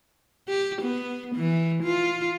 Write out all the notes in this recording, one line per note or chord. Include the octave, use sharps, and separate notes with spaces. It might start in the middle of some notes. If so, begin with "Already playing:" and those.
G4
B3
E3
F4